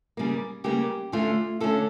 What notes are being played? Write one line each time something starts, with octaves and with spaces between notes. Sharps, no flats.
C#3 G3 A#3
C#3 G3 A#3 G4
D3 A3 C#4 F4
D3 A3 C#4 A4